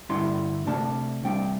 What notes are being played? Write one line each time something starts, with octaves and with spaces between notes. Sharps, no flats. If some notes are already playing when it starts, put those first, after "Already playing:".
G2 D3 G3 E4 C6
C3 A3 D4 A5
C2 C3 G3 D4 G5